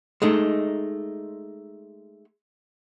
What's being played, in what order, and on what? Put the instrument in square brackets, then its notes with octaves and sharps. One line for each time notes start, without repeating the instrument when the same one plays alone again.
[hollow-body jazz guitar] G#3 A3 D#4